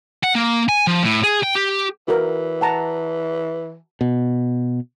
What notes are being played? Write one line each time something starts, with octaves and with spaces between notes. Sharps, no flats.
F#5
A#3
G#5
F3
A2
G#4
G5
G4
E3 F#4 A#4
F#5 A5 A#5
B2